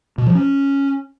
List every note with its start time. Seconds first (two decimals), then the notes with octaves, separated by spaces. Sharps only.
0.18 B2
0.27 F3
0.35 C#4